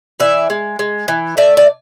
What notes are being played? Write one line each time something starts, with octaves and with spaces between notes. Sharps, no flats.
E3 D5 E5
G#3
G#3
E3
A3 D5 E5
D5